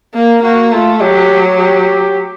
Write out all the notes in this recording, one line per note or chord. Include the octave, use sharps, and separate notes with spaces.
A#3
A#3 F#4
A3 F4
F#3 G4
G4